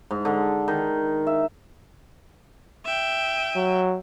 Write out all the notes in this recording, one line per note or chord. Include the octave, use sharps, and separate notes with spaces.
G#2
D3
D#3
E5
E5 G5
F#3